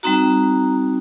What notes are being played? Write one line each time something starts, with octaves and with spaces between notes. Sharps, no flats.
G3 C4 D#4 F#4 A#5